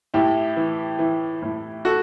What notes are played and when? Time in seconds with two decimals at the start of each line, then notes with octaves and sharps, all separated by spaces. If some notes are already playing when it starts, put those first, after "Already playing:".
0.14 A2 E4 G4
0.57 E3
0.99 E3
1.42 A2
1.85 F#4 A4